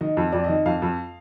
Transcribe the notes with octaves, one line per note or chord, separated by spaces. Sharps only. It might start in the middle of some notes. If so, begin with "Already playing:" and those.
D#3 D#5
F2
F2 D5
D#5
D#3
F2 F5
F2